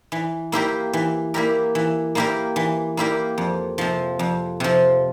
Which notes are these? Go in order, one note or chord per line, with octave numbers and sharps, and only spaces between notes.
E3
A#3 E4 G4 A#4
E3
A#3 E4 G4 A#4
E3
A#3 E4 G4 A#4
E3
A#3 E4 G4 A#4
F2
C3 F3
F2
C3 F3